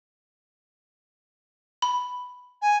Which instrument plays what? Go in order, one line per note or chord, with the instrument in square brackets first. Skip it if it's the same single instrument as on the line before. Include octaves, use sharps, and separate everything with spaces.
[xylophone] B5
[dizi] G#5